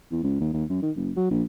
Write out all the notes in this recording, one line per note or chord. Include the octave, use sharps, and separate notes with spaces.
E2
C#2
D#2
D#2
F#2
D#3
F#1
F#3
A#1